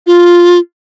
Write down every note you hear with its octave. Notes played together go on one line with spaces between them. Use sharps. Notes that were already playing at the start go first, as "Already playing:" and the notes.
F4